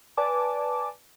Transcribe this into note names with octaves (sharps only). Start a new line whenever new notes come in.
B4 D5 G#5 A5 D6